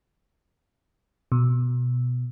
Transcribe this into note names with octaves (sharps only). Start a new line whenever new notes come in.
B2